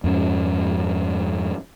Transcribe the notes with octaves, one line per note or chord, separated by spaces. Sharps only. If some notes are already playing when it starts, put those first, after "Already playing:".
F2 G#2 C#4